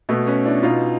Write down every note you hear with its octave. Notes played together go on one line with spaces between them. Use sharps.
B2 A3 B3
B3 C#4
D4 E4
B2 D#4 F4